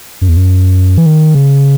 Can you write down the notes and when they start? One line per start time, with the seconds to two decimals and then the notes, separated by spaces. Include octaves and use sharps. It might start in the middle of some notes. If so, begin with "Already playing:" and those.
0.21 F#2
0.28 E2
0.37 F#2
0.98 E3
1.06 D#3
1.35 C#3